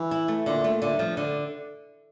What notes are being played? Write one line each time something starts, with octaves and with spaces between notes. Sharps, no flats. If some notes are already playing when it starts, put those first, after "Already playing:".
Already playing: E3
E4
A3
A#2 D3
A3
A#2 D3
G2
F3
D3